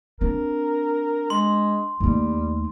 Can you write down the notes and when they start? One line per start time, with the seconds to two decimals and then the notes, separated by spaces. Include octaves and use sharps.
0.21 C4 D4 A#4
1.30 G#3 C6
2.00 D#2 G3 A3